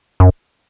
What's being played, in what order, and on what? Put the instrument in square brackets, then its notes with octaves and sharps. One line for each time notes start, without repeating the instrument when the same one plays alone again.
[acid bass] F#2